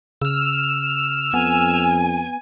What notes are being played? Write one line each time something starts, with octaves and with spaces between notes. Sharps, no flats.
C#3 E6 F6
F2 B3 G#5